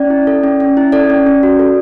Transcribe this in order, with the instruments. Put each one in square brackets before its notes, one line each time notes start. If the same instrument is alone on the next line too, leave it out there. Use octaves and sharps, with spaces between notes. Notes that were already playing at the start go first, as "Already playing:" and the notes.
Already playing: [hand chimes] C#4 D5
E4
A4
C#4
C#4
E4
A4 D5
C#4
C#4
F#4
A4